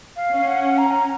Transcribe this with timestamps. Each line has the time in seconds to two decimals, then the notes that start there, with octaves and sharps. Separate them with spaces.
0.16 F5
0.32 C#4
0.47 F#5
0.78 A#5